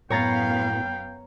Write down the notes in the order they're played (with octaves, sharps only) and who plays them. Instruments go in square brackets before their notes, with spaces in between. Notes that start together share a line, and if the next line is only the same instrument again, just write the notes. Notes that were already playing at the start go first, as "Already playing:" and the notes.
[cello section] F#2 B3 F5 [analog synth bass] A2 [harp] C#5 A#5 A6 [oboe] G5